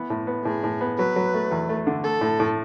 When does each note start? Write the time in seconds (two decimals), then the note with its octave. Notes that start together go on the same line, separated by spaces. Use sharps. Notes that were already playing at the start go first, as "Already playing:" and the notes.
Already playing: E3 B3
0.10 A2
0.27 B3
0.45 A2 G#4
0.64 A2
0.81 B3
0.98 F#3 B4
1.16 F#3
1.34 A3
1.51 E2
1.69 A3
1.87 D3
2.04 A3 A4
2.21 A2
2.40 A2